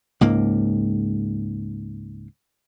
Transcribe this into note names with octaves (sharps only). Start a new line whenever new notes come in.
C#2 G#2 A#3